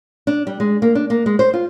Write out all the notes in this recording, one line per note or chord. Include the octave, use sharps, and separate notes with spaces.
D4
G3
G#3
A#3
D4
A#3
G#3
C5
F4